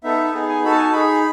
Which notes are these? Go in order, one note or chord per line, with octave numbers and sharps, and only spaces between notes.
B3 D#4 A4 E5
B3 D#4 G#4
G#5
D#4 F#4 A4 B5
A5
G#5
A5
D#4 G#4 B5